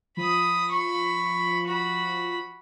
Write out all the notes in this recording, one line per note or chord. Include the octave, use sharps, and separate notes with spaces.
F3 B5 D#6
B5 C#6
F#4 B5